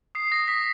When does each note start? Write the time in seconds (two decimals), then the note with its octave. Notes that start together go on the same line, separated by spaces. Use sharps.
0.15 D#6 C7
0.31 D#6 A#6
0.48 D#6 B6